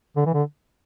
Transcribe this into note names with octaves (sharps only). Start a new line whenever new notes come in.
D3
E3
D3